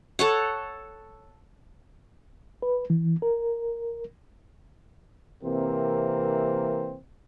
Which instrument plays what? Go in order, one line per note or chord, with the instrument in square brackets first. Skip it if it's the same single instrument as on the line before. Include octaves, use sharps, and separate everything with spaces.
[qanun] A4 C#5 F#5
[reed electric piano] B4
E3
A#4
[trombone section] C3 E3 A#3 C4 A#4